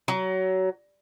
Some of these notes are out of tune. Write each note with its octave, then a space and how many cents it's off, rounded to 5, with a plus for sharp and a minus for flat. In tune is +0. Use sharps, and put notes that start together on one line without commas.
F#3 +25